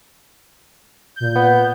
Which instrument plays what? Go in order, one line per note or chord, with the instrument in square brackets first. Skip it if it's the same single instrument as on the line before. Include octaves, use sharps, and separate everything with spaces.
[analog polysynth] A#2 G6
[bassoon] B3